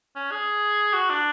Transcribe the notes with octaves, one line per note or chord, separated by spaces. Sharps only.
C#4
G#4
F#4
D4